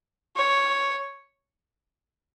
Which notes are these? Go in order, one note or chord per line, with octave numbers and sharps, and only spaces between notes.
C#5